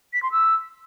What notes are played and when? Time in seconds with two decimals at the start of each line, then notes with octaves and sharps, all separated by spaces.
0.13 B6
0.23 C6
0.32 E6